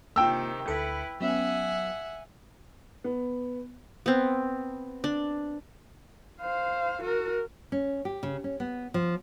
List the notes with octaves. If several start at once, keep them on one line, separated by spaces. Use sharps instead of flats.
C3 D#3 A#3 F4 G5 E6
D2 E4 A4 B4 C#7
F#3 B3 C#4 E5 F#5 G#5
B3
B3 C4
D4
C5 F5
F#4 A#4
C#4
G4
C#3
C#4
B3
F3